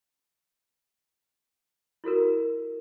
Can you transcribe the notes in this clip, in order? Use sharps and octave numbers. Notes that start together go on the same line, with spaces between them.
E4 F#4 A4 A#4